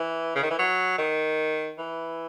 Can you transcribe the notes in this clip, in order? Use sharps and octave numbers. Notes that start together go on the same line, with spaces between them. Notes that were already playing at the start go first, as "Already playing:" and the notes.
Already playing: E3
C#3
D#3
E3
F#3
D#3
E3